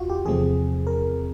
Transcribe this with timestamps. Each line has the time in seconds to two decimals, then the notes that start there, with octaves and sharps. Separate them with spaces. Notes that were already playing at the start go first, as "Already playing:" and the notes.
Already playing: E2 F4 F#4
0.10 G4
0.25 E2 C3 F3 A3 C4 G#4
0.87 A#4